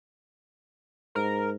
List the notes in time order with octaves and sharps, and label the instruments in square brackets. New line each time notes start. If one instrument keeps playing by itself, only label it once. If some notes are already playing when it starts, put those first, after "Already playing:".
[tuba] G#2 [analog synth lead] A#4